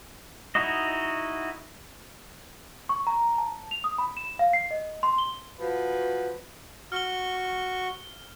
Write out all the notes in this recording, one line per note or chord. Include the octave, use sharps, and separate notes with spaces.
D#4 E4 F#4 D#5
C#6
A#5
A5
F7
D#6
B5
E7
F5
C7
D#5
C6
G7
F3 F#4 B4
F#4 C#6 F6 G7